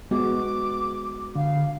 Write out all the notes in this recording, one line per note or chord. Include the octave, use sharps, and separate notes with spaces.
G#3 B3 F#4 D6
D3 F5